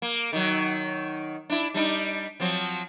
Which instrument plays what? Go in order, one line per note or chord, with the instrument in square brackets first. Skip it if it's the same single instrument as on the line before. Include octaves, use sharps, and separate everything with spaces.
[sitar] A#3
D#3 F#3
D4 E4
G3 D4 D#4
F3 F#3 C4